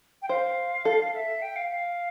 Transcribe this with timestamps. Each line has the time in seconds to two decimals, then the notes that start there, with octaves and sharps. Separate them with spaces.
0.22 G5
0.29 C5 F5
0.85 A4
1.14 E5
1.42 G5
1.56 F5
1.70 F5